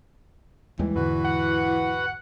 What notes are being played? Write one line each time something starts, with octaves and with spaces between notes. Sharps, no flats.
D#2 E3 G3 G#3
E2 G#2 D3 F#4 B4
F#5